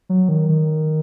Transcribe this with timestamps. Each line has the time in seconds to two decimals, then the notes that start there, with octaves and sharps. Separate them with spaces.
0.09 F#3
0.29 D#3
0.49 D#3